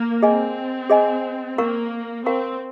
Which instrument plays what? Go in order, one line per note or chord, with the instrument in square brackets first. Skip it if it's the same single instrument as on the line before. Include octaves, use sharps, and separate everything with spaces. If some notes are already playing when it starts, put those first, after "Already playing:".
Already playing: [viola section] A#3
[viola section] C4 [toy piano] G#4 D#5 G#5
[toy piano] G#4 D#5 G#5
[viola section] A#3 [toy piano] A#4 F5 A#5 C#6
[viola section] C4 [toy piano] A#4 F5 A#5 C#6